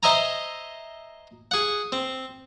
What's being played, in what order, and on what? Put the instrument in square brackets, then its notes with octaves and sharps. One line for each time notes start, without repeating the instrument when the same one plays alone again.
[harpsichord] C5 D#5 E5 G#5 A#5
G#4 F#5
C4